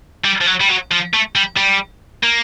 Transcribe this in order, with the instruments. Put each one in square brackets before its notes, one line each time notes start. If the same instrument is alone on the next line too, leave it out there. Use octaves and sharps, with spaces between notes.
[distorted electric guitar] G3
F3
F#3
G3
F#3
F3
A3
G3
G3
A#3